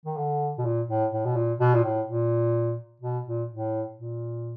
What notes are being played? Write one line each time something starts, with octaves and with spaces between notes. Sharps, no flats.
D#3
D3
B2
A#2
A2
A2
B2
A#2
B2
A#2
A2
A#2
B2
A#2
A2
A#2